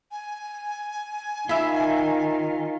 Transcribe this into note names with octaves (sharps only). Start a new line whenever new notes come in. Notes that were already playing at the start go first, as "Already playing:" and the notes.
G#5
D#3 F4 E5 B5